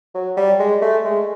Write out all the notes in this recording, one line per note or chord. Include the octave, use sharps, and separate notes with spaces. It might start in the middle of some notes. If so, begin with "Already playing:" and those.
F#3
G3
G#3
A3
G#3